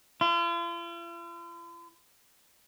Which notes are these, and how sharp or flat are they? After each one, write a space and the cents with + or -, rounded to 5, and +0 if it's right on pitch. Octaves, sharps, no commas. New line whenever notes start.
F4 -45